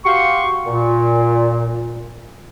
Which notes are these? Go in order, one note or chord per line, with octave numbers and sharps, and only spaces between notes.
F#4 G4 F5 C6 C#6
A#2